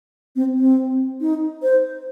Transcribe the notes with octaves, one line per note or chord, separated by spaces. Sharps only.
C4
C4
D#4
C5